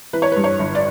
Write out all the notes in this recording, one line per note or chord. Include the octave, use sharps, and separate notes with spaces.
E3 B4
C#5
G2 B4
C#5
G1
D5